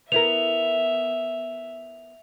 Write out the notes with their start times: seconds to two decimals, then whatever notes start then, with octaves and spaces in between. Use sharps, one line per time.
0.12 B3 E4 A#4 E5 F7